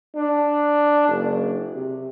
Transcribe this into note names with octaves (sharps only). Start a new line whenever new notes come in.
D4
F#1
C3